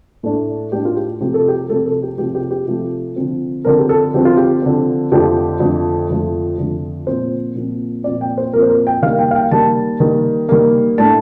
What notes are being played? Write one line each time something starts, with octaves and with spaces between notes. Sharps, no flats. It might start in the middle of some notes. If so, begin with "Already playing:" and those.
A2 A3 D4
A2 A3 D4 G4
F4
G4
C3 F3 A3 G4
A4
G4
C3 F3 A3 A4
A4
G4
C3 F3 A3 G4
G4
G4
C3 F3 A3
D3 F3 C4
D3 F3 C4 A#4
G4
A4
D3 F3 C4 G4
F4
G4
D3 F3 C4
F2 D3 F3 A3 G4
F2 D3 F3 A3
F2 D3 F3 A3
F2 D3 F3 A3
A#2 F3 C4 C5
A#2 F3 C4
A#2 F3 C4 D5
G5
C5
A#2 F3 C4 A#4
C5
A#4
G5
D#3 G3 A#3 F5
G5
F5
G5
D#3 G3 A#3 A5
D#3 G3 A#3
D#3 G3 A#3
A2 A3 D4 A5